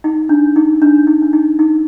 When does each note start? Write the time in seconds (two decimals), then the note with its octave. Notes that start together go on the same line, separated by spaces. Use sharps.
0.04 D#4
0.29 D4
0.56 D#4
0.82 D4
1.07 D#4
1.22 D4
1.33 D#4
1.59 D#4